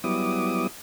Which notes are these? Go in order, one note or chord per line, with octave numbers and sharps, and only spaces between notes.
F#3 G3 B3 E4 D6 D#6